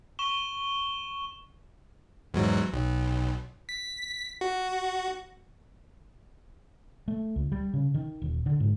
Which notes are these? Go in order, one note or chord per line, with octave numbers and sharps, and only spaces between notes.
C#6 E7 G7
E2 G#2 F#3
B1
B6
F#4
A3
C#2
G3
C#3
D#3
D#1
D3
G#2